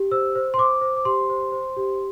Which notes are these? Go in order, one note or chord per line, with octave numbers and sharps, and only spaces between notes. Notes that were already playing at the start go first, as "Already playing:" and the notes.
Already playing: G4
C5 E6
C5
C6
C5 D6
C5
D6
G4 C6
C5
C5
G4